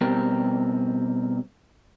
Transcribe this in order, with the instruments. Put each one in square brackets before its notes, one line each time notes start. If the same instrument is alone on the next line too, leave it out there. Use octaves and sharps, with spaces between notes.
[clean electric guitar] B2 G3 C4 G4 A#4